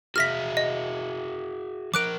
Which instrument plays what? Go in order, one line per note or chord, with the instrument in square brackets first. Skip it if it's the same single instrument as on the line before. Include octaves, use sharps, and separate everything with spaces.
[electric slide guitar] F#4 G#4 E5 [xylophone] F6 A#6 B6
[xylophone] D#5
[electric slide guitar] F3 A#4 [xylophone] D6 F#6 D7